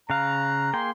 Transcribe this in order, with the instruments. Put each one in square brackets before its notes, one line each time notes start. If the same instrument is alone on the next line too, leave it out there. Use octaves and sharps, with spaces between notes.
[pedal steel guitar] C#3 F5 [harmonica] A#5 [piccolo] F#6
[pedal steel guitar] A#3 G#4 G5 [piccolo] C6